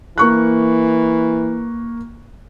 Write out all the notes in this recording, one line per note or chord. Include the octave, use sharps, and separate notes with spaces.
E3 A#3 C#6 F#6